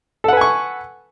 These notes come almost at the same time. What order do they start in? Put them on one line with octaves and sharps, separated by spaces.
A4 F#5 B4 G#5 C#6